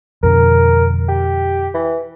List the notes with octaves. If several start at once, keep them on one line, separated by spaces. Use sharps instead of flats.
F2 B2 D3 A#4
G4
E3